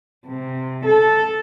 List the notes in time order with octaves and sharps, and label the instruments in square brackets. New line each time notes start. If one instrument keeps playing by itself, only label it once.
[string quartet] C3
A4